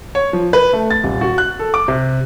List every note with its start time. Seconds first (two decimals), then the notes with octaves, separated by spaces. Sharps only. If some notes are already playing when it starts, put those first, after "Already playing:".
0.15 C#5
0.33 F3
0.53 B4
0.73 A3
0.91 A6
1.03 D#1
1.21 F#4
1.38 F#6
1.59 A4
1.74 D6
1.88 C3